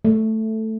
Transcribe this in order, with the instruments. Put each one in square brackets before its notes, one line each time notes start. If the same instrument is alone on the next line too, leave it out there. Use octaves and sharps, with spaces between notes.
[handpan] A3